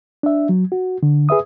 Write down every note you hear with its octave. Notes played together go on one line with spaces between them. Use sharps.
D4 E5
F#3
F#4
D3
G#4 B4 E5 D#6